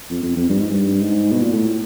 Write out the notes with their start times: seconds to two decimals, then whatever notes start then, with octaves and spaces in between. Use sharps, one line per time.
0.10 F2
0.23 F2
0.36 F2
0.49 G2
0.60 G#2
0.70 G2
1.01 G#2
1.31 B2
1.42 A#2
1.52 A2